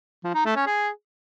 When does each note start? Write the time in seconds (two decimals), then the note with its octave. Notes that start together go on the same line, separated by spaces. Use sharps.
0.24 F3
0.35 D#4
0.45 A3
0.56 C#4
0.66 G#4